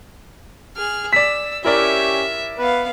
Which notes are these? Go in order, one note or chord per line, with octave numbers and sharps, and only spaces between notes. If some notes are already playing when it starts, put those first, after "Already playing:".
G#4 F6
D5 E6 B6
C#4 E4 G4 A#4 D5 E5
B3 B4 F5